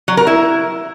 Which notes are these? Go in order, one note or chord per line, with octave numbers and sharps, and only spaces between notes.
F#3
A#4
E4